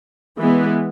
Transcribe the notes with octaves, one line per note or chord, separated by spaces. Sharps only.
E3 G#3 B3